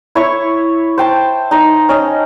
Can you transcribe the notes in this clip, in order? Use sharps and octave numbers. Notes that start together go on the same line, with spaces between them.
E4 C#5 E5 C#6
C5 G5 A5
D#4 D#5
C#4 D#5